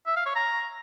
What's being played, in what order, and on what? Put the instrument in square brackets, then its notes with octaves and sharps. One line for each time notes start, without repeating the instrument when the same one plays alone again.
[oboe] E5
F5
C#5
A#5